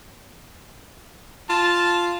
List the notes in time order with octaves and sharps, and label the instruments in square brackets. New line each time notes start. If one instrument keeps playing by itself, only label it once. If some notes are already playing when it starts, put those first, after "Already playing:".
[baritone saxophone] F4 [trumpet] A5